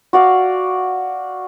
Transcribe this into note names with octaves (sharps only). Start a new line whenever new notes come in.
F#4 D5 F5